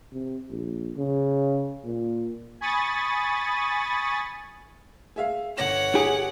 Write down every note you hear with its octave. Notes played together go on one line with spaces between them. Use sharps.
C3
A#1
C#3
A#2
G#5 B5 C#6 D#6 A6
G#4 E5 F5
G1 C#5 F#5 A#6 E7
G4 G#4